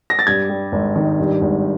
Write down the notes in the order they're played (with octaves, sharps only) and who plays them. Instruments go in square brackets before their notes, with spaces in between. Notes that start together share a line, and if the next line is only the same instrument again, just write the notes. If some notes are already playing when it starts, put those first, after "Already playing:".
[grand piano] A#6
A6
G2 G#6
G3
G#1
D#3
G2
G#1